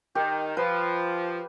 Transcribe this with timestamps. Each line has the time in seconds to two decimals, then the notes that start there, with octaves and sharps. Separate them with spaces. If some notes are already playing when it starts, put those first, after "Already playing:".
0.15 D#3 G4
0.57 F3 B4